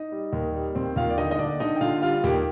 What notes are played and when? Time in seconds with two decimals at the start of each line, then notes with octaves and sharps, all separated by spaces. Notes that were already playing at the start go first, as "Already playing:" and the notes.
Already playing: D#4 D#5
0.12 G3
0.33 D#2
0.54 G3
0.75 D#2 C4 C5
0.96 D#2 F4 F5
1.10 D5
1.17 D3 D#4 D#5
1.31 D#5
1.39 D3 D4 D5
1.60 D3 D#4 D#5
1.76 G5
1.81 D3 F4 F5
2.02 G3 F4 F5
2.24 D#2 G4 G5